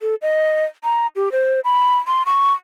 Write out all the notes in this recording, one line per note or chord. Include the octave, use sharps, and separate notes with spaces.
A4
D#5
A#5
G4
C5
B5
C6
C#6